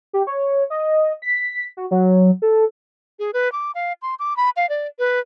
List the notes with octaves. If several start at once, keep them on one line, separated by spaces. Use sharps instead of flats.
G4
C#5
D#5
B6
F#4
F#3
A4
G#4
B4
D6
F5
C6
D6
B5
F5
D5
B4